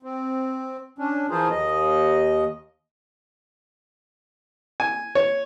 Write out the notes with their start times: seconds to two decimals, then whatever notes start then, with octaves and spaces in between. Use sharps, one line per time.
0.03 C4
0.98 C#4 D4
1.30 E3 F3 F4 G#4 A#4 C5
1.51 D#2 D#5
4.80 G#5
5.15 C#5